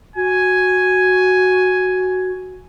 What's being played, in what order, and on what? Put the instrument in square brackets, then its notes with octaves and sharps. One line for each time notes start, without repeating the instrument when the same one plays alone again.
[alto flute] F#4 [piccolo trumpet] G#5